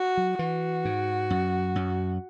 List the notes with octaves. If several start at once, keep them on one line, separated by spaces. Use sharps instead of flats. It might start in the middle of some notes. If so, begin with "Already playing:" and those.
Already playing: F#4
F#3
E3 F#4
G#2
F#2
F#2